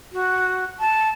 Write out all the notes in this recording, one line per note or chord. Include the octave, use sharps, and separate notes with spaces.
F#4
A5